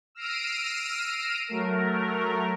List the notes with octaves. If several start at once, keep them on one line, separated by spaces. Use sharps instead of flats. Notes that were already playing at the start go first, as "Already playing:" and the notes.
E6 F6 A#6 C7 D7 D#7
F#3 A3 A#4